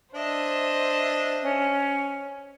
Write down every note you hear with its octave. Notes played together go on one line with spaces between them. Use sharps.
D4 C5 D#5 E5
C#4